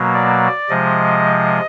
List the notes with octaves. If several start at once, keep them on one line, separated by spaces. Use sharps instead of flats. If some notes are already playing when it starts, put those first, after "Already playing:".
Already playing: B2 F#3 A#3
D5
C3 F3 G#3 D#5